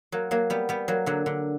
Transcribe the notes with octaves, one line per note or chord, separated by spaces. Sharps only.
F#3 A#3
F#3 A#3
G3 B3
G3 B3
F#3 A#3
D3 F#3
D3